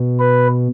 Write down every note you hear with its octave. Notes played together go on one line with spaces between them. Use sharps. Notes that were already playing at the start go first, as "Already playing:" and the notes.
Already playing: B2
B4